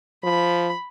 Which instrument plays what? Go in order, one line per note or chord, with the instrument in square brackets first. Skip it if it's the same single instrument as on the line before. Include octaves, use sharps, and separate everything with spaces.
[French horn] F3 [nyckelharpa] B5